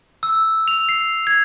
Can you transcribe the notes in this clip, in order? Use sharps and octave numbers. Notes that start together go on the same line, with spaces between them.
E6
F7
C7
G#6